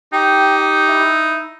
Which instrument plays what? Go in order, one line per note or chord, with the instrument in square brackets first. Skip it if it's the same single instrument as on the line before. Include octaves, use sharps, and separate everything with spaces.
[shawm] D#4 [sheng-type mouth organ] G4 [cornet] G5
[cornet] E4